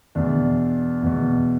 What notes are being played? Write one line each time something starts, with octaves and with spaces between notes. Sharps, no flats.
E2 B2 D4
E2 B2